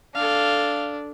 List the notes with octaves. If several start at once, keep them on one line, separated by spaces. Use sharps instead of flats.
D4 A4 F5